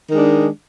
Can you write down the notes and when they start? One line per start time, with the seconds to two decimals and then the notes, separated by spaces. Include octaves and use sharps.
0.09 D#3
0.13 G#3
0.17 D4